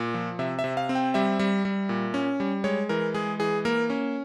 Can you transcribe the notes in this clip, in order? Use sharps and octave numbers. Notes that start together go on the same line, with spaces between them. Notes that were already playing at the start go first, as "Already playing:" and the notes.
Already playing: A#2
F3
C3 E5
E5
C3
F5
C4
G5
G3 E5
G3
G3
A#2
C#4
G3
G#3 C#5
E3 A#4
G#3 G#4
E3 G#4
A#3 A#4
C#4